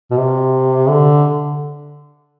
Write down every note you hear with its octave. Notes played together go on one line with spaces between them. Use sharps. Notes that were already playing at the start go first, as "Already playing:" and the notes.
B2
C3
D3